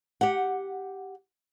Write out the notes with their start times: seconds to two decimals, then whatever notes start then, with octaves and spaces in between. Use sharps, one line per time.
0.21 G4 F#5